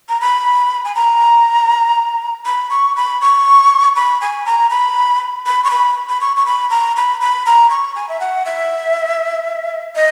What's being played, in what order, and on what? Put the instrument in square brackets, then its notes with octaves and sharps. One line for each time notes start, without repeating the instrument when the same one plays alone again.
[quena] A#5
B5
G#5
A#5
B5
C#6
B5
C#6
B5
G#5
A#5
B5
B5
C#6
B5
B5
C#6
C#6
B5
A#5
B5
B5
A#5
C#6
G#5
E5
F#5
E5
D#5